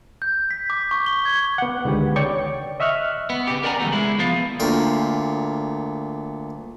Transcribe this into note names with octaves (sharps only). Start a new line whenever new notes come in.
G6
B6
D6
C#6
G7
G#6
B3 F#5
C#2 D3 D#3 G4 B4
C#5 D5 G5 C#6 D6
D#5 E5 C#6 F6 F#6
B3
C#3 G4
A#4 D5 F#5 G#5 A#5
C#3 E3 G3 A3 B3
G#3 E4
F3 B3 F4
D2 A#2 A#4 G5